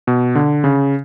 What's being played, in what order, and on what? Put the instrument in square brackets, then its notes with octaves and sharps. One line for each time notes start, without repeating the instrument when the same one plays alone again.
[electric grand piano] B2
D3
C#3